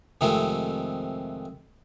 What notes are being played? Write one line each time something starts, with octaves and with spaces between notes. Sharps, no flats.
F2 C3 D#3 G#3 A3 C4